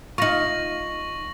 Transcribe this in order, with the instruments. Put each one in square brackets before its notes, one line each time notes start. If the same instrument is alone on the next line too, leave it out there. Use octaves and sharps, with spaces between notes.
[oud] D#4 F4 [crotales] C#6 A#6 F#7